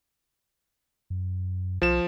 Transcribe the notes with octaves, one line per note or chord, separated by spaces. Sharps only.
F#2
B1 F3 E7